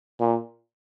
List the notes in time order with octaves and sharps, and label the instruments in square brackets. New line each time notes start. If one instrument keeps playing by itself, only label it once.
[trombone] A#2